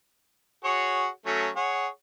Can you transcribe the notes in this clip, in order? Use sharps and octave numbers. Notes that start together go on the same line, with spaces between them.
F#4 G#4 C#5
F#3 A3 C#4
G#4 C#5 F#5